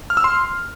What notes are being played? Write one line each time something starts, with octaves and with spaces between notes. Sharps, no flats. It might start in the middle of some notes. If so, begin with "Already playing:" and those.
F6
E6
C6